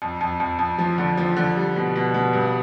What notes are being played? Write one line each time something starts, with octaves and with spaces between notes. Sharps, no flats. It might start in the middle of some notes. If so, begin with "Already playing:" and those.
F2
F2
F2
F2
F3
D3
F3
D3
G3
B2
B2
B2
G2